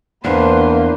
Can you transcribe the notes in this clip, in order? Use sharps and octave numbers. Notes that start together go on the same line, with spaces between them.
E2 A#3 D4 B4 C5